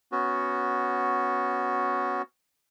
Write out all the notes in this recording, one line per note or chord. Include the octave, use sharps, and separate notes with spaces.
B3 C#4 F#4